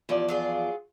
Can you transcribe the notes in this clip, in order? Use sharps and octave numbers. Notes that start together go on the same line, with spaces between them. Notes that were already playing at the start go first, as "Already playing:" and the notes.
E2 F3 E4 G4 D5
F#3 F4 G#4